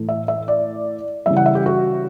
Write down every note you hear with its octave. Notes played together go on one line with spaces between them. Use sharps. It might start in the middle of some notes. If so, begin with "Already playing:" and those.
Already playing: A2 E3 A3
E5
E5
D5
C#3 E3 G3 E5
F#5
E5
G4
F#4